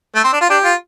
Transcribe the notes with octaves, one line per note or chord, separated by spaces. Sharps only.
A3
C4
D4
F4
D4 G4
F4